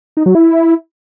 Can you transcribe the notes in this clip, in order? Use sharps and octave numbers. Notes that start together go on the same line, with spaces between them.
D#4
F#3
E4